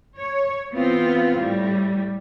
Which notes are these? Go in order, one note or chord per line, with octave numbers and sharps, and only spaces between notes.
C#5
E3 B3 C4 F4
A2 G3